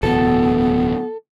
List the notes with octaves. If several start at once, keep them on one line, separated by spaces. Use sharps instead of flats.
D1 E2 B2 B3 A4